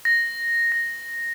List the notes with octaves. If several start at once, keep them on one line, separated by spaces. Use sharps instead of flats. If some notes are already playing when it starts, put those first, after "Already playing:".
A#6
A#6